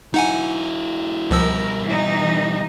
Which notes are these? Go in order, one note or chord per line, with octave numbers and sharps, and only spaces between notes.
F#3 D#4 E4 F#5 G#5
C#2 B2 F3 G3 A#4 E6
E3 D#4